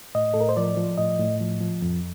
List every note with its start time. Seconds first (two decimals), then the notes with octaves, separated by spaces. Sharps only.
0.15 A2 D#5
0.34 A2 A4
0.41 A#4
0.49 C5
0.57 F3 D5
0.77 F3
0.98 A2 D#5
1.20 A2
1.40 F3
1.61 F3
1.82 F2